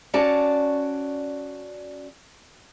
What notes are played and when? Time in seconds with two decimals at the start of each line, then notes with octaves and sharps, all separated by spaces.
0.14 C#4 F#4 D5 A5